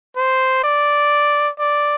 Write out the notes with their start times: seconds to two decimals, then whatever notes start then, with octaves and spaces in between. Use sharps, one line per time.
0.16 C5
0.64 D5
1.59 D5